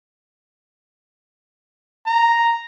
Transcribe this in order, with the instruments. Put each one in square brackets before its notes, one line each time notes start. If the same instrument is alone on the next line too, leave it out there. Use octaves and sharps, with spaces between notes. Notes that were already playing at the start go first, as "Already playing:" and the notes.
[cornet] A#5